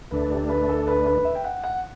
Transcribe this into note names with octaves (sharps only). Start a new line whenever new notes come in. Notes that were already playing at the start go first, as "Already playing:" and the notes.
D2 D3 A3 D4 B4
G4
B4
A4
B4
B4
E5
G5
F#5
F#5